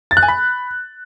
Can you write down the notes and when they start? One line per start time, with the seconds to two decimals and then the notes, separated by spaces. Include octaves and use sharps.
0.11 A6
0.17 F#6
0.23 G#5
0.28 B5